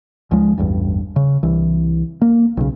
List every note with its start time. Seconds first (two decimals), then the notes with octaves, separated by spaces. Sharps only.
0.31 C#2 F3 G#3
0.58 A1 E2 G2
1.16 C#3
1.43 C2 E3
2.22 A#3
2.57 B1 C#3